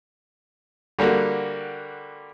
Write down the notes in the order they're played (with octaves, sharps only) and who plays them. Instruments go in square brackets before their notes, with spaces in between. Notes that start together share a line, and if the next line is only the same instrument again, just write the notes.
[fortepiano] D3 G3 A#3 F#4